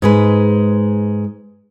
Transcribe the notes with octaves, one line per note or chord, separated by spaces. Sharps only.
G#2 G#3 B4